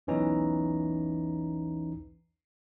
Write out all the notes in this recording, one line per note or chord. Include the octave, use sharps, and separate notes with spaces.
B1 E2 E3 C#4 D#4 A#5